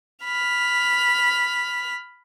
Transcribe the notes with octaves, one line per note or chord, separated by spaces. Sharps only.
B5 F6